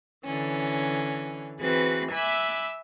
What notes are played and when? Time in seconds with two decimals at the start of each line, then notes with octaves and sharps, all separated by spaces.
0.25 D3 E3 C#4
1.61 E3 C4 F#4 G#4 B4
2.12 E5 G#5 B5 D6 E6 F#6